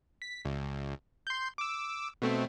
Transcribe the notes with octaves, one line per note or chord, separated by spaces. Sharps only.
B6
C#2
C6 G6
D6 E6
B2 A3 C4